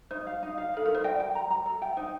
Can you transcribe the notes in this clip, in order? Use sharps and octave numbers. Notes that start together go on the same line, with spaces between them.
D#4 C5
F5
D#4
F5
D#4 A4
D#4 A#4
C5
D5 G5
G5
A#5
A#5
A4
G5
D#4 C5